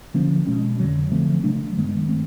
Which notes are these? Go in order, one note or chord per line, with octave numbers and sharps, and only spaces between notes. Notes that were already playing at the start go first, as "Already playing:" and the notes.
D3 F3 A#3 C#4
B2 G#3 C#4
F2 D3 F#3
D3 F3 A3 C4
C#3 F#3 A3 D4
G2 D#3 G#3 B3
A3 C4